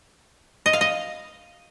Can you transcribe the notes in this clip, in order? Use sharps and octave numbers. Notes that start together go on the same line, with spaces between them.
D#5
F5
D#5